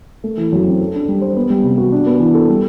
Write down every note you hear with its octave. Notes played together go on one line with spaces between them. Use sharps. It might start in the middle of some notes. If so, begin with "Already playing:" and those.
A3
E3
F#2
C4
A4
D4
G3
C5
B3
G3
C3
F#4
D4
B3
E3
A4
G3